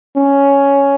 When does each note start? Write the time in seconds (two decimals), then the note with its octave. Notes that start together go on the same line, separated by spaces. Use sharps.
0.17 C#4